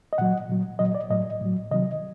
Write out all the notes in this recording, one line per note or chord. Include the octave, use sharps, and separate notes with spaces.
D#5
A#2 F#3 F#5
A#2 F#3
A#2 F#3 D#5
D5
A2 F#3 D#5
A2 F#3
C3 D#3 F#3 D#5